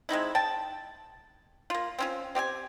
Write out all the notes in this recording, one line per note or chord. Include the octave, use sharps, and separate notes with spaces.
G#3 C4 D#4 E4
G5 A5
A#3 F4
C4 C#4 F4
C4 G4 E5 G#5